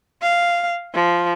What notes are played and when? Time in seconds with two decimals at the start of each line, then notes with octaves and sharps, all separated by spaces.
0.22 F5
0.94 F3